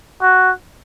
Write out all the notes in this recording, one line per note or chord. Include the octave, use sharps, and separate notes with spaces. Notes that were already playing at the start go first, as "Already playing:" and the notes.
F#4